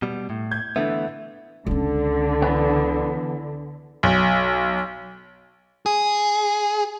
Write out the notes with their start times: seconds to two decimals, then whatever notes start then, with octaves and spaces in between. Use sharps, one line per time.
0.02 B2 G3
0.30 A2
0.51 G6 G#6
0.76 D3 E3 A3 B3 E5 A6
1.66 C#2 D3 C#4
2.42 E3 B3
4.03 B1
5.86 G#4